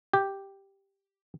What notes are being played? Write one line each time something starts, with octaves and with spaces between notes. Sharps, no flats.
G4